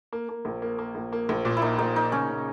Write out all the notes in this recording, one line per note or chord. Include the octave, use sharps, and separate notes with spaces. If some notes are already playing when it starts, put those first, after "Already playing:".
A#3
A#3
A#1
A#3
A#3
A#1
A#3
A#1
A#2
E4
A#3 D#4
A#1 D#4
A#3 D#4
C#3 C#4
C#3